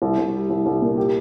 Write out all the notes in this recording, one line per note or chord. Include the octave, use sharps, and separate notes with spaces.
C2
C2
G3
C2
C2
A#2
G4